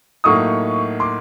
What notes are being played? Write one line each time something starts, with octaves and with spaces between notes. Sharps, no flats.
A2 F#3 A#3 D#4 C#6 D#6
C6 D6